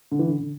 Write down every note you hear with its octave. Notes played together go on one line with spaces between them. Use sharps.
D3
E3
D3
D3